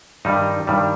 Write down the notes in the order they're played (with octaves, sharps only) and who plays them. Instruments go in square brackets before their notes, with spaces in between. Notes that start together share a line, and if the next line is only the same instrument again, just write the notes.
[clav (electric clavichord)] G2 D#3 G3 D#4
G2 D#3 G3